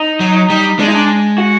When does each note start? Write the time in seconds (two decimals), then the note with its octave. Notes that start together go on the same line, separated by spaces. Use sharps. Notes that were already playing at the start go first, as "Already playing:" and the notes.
Already playing: D#4
0.20 F#3
0.50 G3
0.79 G#3 D4
0.88 D#4
0.95 D4
1.38 F#4